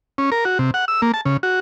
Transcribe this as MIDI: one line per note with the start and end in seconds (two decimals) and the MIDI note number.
0.18 0.30 61
0.32 0.44 70
0.45 0.58 66
0.59 0.71 48
0.74 0.85 78
0.88 1.01 88
1.02 1.12 58
1.14 1.21 81
1.26 1.37 49
1.43 1.60 66